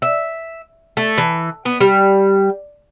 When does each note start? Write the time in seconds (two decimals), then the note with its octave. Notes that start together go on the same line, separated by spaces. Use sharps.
0.02 E5
0.97 A3
1.18 E3
1.65 B3
1.80 G3